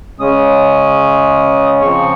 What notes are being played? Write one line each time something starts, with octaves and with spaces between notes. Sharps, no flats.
C#3 G#3 C#4 D#6
C#3 F3 C4 C#6